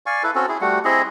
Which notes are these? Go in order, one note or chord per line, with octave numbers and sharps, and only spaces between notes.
D5 F5 G#5 C#6
E4 A4 B4
C4 C#4 F#4 A4
E4 G#4
G3 A3 F#4 F#5
C4 E4 G#4 D#5